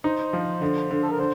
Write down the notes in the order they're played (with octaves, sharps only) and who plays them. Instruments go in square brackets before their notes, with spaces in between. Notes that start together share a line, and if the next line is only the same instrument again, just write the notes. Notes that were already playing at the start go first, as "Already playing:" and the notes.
[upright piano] D#4 [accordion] C5
[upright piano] F3
D3
D3
[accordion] A4
A#4
[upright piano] D3 [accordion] C5